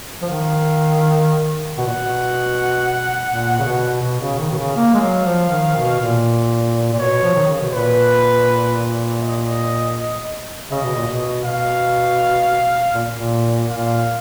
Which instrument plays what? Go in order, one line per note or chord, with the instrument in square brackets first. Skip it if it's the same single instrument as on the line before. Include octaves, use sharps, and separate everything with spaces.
[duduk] F3
[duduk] D#3 [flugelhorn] F5
[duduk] B2 [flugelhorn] F#5
[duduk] A#2
B2
A#2
C#3
B2
B2
C#3
D#3
B2
C#3
[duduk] A#3 [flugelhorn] F5
[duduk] G#3
F#3
F3
D#3
B2
A#2
A#2
[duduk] B2 [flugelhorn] C#5
[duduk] F3
D#3
C#3
B2
[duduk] A#2 [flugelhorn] B4
[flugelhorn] D#5
[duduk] C#3 [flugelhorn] D#5
[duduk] B2
A#2
B2
[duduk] B2 [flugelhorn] F5
[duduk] A#2
A#2
[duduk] A#2 [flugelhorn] F5